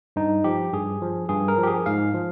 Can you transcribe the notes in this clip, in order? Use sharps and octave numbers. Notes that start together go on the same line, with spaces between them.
G2 D#4
F3 G4
G2 G#4
F3
G2 G#4
A#4
F3
G4
G#4
G#2 F5
F3